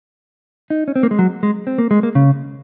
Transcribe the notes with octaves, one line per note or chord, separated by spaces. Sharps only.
D#4
C#4
C4
A#3
G#3
F#3
G#3
C4
A#3
G#3
A#3
C#3